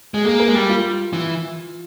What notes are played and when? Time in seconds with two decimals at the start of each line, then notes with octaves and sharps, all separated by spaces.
0.14 G#3
0.25 A#3 G#4
0.40 A#4
0.48 G#3
0.54 G3 G4
0.70 F4
1.13 E3